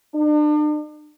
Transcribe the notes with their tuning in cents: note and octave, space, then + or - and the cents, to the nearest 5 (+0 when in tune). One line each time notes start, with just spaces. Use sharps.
D4 +40